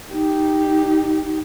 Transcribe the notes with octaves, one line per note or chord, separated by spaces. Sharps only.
D#4 G4